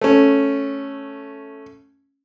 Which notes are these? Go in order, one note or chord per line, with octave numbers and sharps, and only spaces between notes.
A3 C#4